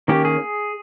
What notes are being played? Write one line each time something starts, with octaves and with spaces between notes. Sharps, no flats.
D#3 A#3 C#4 G4
G#4